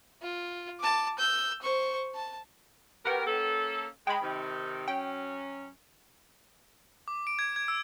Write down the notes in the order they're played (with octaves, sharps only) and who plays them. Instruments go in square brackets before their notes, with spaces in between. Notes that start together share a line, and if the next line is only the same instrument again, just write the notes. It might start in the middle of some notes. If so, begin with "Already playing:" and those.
[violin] F4
A5 D6
E6 G6
C5 C#6
A5
[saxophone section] B2 G4 A#4 [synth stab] B4 F#5 G5
[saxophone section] A#3 C#4 A4
[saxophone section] G#3 [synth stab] G5 B5
[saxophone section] C3 D#3
[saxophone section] F#3 C#4 [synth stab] G5
[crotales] D6
D7
G#6
G#6
E6